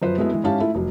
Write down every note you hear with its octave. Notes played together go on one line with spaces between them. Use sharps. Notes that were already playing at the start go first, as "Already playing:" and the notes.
F#2 F3 B4 C5
F#3 G#3 A3 B3 E4 E5
E3 G#3
G#2 C#4 E4 G4 F5 A5
A3 E4 F4
F1 F#3